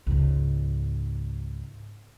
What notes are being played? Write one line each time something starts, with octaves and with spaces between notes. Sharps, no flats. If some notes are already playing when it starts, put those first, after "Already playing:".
C#2 G#2